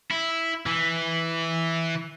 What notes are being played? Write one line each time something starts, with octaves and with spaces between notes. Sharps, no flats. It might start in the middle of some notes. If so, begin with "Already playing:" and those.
E4
E3